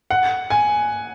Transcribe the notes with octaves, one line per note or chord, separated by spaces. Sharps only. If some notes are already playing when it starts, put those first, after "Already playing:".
F#5
G#5